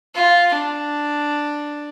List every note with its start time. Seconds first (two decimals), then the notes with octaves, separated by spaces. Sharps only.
0.15 F4
0.54 D4